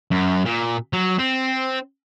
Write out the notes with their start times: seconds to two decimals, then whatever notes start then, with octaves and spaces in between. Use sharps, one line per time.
0.11 F#2
0.45 A#2
0.93 F#3
1.19 C4